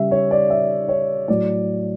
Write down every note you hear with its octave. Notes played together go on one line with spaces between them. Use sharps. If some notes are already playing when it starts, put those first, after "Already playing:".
Already playing: C#3 G3 E5
C#5
D5
E5
C#5
A2 F#3 D5